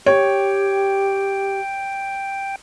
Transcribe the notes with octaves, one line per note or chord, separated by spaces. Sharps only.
G4 C#5 G5